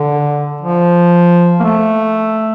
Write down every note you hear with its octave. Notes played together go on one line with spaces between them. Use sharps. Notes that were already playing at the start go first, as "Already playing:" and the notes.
Already playing: D3
F3
A#3
A3